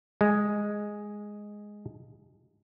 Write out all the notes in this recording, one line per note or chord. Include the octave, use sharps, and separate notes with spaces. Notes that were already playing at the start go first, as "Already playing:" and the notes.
G#3